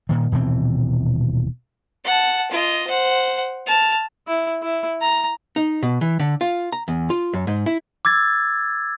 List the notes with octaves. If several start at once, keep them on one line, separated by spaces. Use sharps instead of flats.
A#2 D#3
D#1 B2 E3 C4
F#5 A5
F4 D#5
C5 F#5
A5 F6
E4
E4
A#5
D#4
B2
E3
D3
F4
A#5
E2
F4
F#2
G#2
E4
D6 E6 G#6 A6